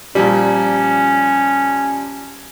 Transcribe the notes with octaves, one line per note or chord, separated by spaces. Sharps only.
A#2 F3 G3 C#4